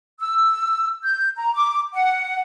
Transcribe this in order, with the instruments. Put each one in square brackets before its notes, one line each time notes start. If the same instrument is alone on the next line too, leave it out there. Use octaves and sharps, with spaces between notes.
[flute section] E6
G6
A#5
D6
F#5